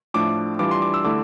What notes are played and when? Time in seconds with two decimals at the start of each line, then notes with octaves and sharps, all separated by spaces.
0.14 A2 F3 A3 D4 D6
0.59 E3 G3 D4 F4 D6
0.71 C6
0.82 D6
0.94 E6
1.04 D3 A3 E4 D6